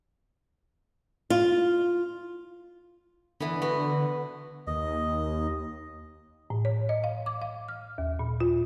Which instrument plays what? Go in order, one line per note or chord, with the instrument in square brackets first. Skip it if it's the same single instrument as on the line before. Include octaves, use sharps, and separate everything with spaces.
[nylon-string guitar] F4
[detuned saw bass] D3 [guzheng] E3 B3
[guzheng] B3 F#4
[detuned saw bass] D#2 [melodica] D#5
[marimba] A2
C#5
D#5
F5
D6
F5
F6
D#2
A#2
F4